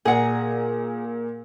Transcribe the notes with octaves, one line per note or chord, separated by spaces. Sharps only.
A#2 G#4 D5 F#5 G#5 A#5